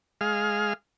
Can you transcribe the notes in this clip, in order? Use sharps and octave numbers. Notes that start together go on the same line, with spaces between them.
G#3 G#4 F5 F6